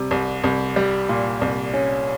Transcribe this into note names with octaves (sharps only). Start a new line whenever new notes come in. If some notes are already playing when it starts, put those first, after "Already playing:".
Already playing: C3 G3
C2
C2
G3
A#2
C2
C#4